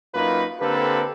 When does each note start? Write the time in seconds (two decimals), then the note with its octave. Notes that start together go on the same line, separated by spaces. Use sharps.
0.15 F#2 A#3 D#4 F4 B4
0.61 D3 A#3 C4 G4 A4 B4